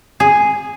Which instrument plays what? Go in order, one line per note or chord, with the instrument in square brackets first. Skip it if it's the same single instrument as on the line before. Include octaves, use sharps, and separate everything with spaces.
[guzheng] G#4